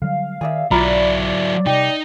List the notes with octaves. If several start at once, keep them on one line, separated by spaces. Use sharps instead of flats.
D3 F#3 G3 F5
D#3 G#4 D5 E5
B1 F#3 E4 F4 D5 A#5 B5
C3 G3 D#4 G4